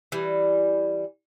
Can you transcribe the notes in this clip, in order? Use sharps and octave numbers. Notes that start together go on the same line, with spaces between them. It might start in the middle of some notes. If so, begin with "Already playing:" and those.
E3 G3